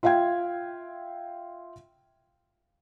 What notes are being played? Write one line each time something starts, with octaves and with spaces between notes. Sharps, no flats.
F4 E5 F5 G5 G#6